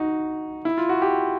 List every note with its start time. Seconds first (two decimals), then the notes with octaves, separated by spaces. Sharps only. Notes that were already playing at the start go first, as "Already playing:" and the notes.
Already playing: D#4 F#4
0.65 E4
0.77 F4
0.89 F#4
1.02 G4